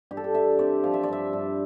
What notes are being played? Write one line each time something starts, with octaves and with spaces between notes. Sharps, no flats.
G2 G4
A4
G4
G2 E5
C4 D5
F3 F5
E5
D5
G2 E5
G2